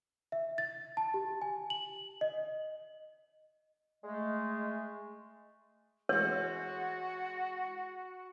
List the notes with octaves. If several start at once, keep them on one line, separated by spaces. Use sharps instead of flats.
E5
A6
A5
G4
G#5
F#7
D#5
G#3 A3
E3 G#3 F#4 C#5